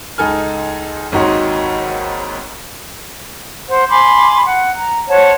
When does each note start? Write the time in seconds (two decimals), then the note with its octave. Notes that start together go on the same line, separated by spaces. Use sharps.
0.18 C#2 D#4 A4 G#5 F6
1.12 G#1 D#2 D#4 F#4 C#5 C6
3.68 C5 F#5
3.89 G#5 B5 C6 D6
4.45 F#5
4.73 A#5
5.07 C5 C#5 F#5 A5